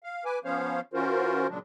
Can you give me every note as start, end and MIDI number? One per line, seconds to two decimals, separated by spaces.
0.04 0.24 77
0.25 0.39 71
0.25 0.39 80
0.25 0.39 86
0.45 0.81 53
0.45 0.81 59
0.45 0.81 61
0.45 0.81 72
0.45 0.81 73
0.45 0.81 77
0.94 1.47 52
0.94 1.47 61
0.94 1.47 65
0.94 1.47 66
0.94 1.47 70
0.94 1.47 72
1.49 1.59 46
1.49 1.59 49
1.49 1.59 54
1.49 1.59 56
1.49 1.59 62